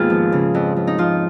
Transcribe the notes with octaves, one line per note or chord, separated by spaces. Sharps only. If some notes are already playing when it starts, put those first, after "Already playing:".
Already playing: D#2 G#2 B3 F4 G#4
F3
C#3
F2
F2
D#4
F3 F4